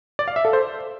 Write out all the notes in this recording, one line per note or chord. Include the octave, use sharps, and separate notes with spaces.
D5
F5
E5
A4
C5